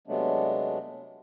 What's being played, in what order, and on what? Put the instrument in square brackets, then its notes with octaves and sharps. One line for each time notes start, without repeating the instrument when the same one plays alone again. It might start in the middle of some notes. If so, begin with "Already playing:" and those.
[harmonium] C3 F#3 G#3 A3 B3 D4